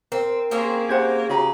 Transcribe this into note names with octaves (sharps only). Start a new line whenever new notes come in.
C4 A#4
A#3 C4 C#4 G#4
G4 C5 F#5 G#6
C#3 F#4 G4 C#5 A#5